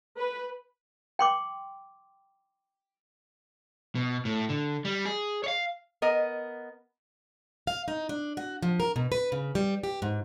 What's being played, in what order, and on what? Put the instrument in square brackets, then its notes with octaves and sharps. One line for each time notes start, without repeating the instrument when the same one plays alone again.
[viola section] B4
[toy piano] G5 C6 D6
[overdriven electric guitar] B2
A2
D3
G3
G#4
C#5 F5
[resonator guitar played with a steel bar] B3 A#4 D#5
[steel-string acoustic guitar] F5
D#4
D4
F#4
F3
A#4
B2
B4
C#3
G3
G4
G#2